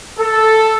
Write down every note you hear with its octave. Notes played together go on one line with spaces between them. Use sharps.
A4